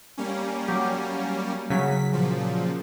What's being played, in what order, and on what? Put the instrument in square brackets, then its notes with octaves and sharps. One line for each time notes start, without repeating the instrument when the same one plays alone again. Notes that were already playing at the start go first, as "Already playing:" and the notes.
[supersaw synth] G3 A#3 C#4
[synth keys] F#3 G4
[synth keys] C#3 F#3 [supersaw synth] B6
[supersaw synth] A#2 F3